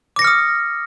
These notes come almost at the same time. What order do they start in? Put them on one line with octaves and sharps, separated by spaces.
D6 A#6 C#7 F6 D#6